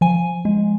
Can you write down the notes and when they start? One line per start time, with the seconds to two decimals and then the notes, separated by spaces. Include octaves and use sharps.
0.01 F3 G#5
0.45 G#3